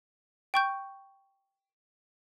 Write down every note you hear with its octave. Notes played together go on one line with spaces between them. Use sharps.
G5 C#6 G6